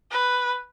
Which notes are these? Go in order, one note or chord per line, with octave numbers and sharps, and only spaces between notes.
B4